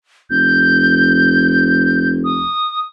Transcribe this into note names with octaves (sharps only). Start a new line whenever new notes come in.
F1 G6
D#6